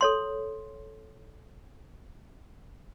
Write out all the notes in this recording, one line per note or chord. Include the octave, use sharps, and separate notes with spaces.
A4 C#5 C6